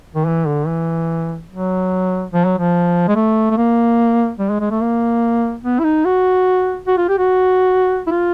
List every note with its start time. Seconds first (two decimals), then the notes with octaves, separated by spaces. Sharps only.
0.15 D#3
0.27 E3
0.47 D3
0.67 E3
1.51 F#3
2.33 F3
2.45 F#3
2.58 F3
3.08 G#3
3.15 A3
3.50 A3
3.57 A#3
4.39 G3
4.50 G#3
4.60 G#3
4.71 A3
4.81 A#3
5.64 B3
5.79 E4
5.84 D#4
6.05 F#4
6.88 F#4
6.97 F4
7.09 G4
7.18 F#4
8.07 E4
8.11 F4